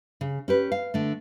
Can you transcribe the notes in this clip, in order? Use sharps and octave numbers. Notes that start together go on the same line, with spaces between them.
C#3
C#4 G4 B4
F5
D3 A3